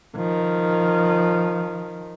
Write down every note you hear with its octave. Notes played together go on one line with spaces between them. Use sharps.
D#3 F3